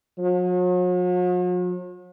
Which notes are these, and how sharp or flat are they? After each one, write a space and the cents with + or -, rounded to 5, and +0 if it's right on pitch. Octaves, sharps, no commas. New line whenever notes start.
F#3 -45